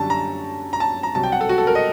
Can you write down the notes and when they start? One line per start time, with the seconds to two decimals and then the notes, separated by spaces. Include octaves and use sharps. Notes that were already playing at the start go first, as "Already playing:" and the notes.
Already playing: F#2 D3 G3 A5
0.10 A#5
0.73 A#5
0.80 A5
1.03 A#5
1.15 C2 C3 F#3 A5
1.23 G5
1.32 F#5
1.41 A4
1.49 F#4
1.58 A4
1.67 A#4
1.75 D#5